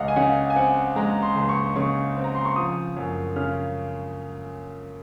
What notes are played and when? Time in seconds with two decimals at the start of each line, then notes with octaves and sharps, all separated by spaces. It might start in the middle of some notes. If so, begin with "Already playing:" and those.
Already playing: C#2 G#3 D#5 F5 F#5
0.08 G#5
0.16 C#3 F#5
0.50 G#5
0.56 C4 F#5
0.96 G#3 A#5
1.22 C6
1.35 C#2
1.49 C#6
1.76 C#3 C#6
2.17 C4
2.24 A#5
2.35 C6
2.45 C#6
2.56 F3 D#6
2.96 F#2
3.36 C#3 F6